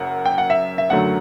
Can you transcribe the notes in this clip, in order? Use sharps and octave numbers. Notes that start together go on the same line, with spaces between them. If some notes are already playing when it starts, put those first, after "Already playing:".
Already playing: F#1 F#2 F#5
G5
F#5
E5
E5
F#1 F#2 D3 F#3 A3 F#5